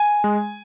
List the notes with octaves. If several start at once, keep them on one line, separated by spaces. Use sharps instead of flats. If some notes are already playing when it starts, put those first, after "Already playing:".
Already playing: G#5
G#3